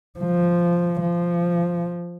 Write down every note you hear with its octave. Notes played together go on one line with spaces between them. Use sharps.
F3
F3